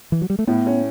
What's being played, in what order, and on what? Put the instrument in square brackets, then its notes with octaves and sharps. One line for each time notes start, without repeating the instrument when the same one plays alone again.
[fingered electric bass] E3
F#3
G3
A3
[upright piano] A2 [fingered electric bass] B3
[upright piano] C#4